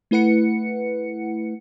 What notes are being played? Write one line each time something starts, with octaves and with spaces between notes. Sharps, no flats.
A3 E4 B4 F#5 C#7